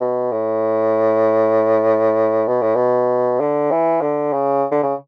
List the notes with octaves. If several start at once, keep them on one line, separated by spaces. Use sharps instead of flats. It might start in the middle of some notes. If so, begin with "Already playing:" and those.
B2
A2
B2
A2
B2
D3
E3
D3
C#3
D3
C#3